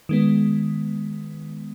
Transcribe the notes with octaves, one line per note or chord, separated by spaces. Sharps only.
D#3 G#3 B3